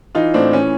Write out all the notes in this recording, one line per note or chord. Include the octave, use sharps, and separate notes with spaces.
E3 D#4 F4
A2 C4 D4
E3 C#4